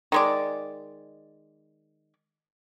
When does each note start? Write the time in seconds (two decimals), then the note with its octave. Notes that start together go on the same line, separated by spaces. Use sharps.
0.12 D#3 G#3 D5